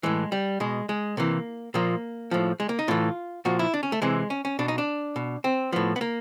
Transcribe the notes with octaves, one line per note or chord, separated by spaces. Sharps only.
A2 E3 G#3
G3
B2 G#3
G#3
C3 E3 A#3
A#2 F3 A#3
A2 F3
G#3
A#3
D#4
A2 E3 F4
A#2 F3 F#4
E4
D4
C#4
A3
C3 E3 G#3
C#4
C#4
B2 D4
D#4
D4
B2
C4
A2 F3 B3
B3
A#3